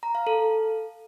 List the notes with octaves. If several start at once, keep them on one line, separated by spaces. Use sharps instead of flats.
A#5
F5
A4